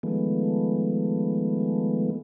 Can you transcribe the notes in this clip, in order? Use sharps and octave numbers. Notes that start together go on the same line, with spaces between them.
D#3 F3 G#3 A3 B3